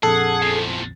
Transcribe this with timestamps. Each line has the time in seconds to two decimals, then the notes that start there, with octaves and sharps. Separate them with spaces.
0.03 A#1 F2 G#4 A4 F#5
0.42 E2 F3